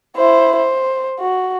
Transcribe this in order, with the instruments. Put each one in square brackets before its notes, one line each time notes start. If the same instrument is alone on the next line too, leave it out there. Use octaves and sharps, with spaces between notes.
[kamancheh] E4 C5
C5
F#4